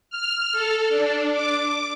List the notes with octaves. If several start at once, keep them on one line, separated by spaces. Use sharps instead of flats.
F6
A4
D4
D6